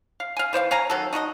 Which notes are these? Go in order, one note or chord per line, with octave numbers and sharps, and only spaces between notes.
F5
F5 G#5
E3 C5 D5 F5
C#5 F5 G#5 A#5
D#3 F#3 A4
D#4 F#4 A4 D#5